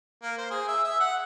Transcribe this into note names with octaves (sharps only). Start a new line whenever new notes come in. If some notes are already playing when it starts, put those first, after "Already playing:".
A#3
C5
G#4
E5
E5
F#5